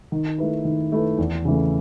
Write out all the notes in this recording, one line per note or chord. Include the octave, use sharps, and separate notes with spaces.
D#3
A3 E4 B4
D#3
A3 E4 B4
E2
C#3 E3 A3